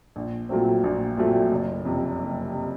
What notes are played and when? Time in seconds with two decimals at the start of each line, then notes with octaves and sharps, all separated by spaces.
0.16 A#1
0.49 A#2 F#3 A3 C4
0.84 A#1
1.17 A#2 F#3 A3 C4
1.51 F#1
1.85 F2 C3
2.19 F#1
2.53 C3